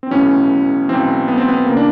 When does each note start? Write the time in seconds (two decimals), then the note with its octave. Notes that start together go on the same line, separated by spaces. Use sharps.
0.03 C4
0.11 B1 A2 E3 C#4
0.89 B1 A2 E3 C4
1.28 B3
1.38 C4
1.48 B3
1.66 C#2 C#3 E3 A#3
1.77 D4